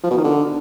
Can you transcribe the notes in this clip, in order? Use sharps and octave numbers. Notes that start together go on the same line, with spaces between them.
F3
B2
D#3
D3